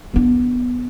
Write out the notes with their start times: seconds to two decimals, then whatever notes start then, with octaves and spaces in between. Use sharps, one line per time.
0.14 B3 D4